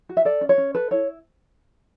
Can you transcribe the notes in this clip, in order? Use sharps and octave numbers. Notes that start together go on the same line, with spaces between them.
F#4
E5
A4 D5
C#4
C#5
C#4
A4 B4
E4 C#5